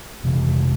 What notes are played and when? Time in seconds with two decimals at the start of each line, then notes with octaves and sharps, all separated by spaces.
0.24 F2 C3 E3